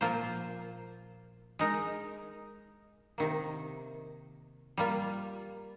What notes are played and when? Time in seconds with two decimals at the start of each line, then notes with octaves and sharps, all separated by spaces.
0.01 A#2 F3 A#3 F4 C5
1.59 G#3 D#4 A#4
3.18 C3 D#3 A#3
4.77 G3 A#3 F4